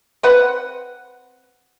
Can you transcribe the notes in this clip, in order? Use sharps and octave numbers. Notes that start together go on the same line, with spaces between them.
C4 B4 F#5